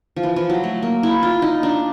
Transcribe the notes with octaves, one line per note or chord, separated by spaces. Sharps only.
F3
E3
F3
F#3
A3
A#3
E4
F4
D#4
D4